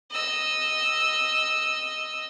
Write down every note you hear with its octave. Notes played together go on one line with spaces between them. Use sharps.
D#5 E6